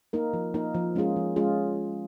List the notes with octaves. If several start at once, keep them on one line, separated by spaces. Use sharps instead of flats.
A#3 D#4 A#4
F3
A#3 D#4 A#4
F3
G#3 C#4 F4 G#4
F3
G#3 C#4 F4 G#4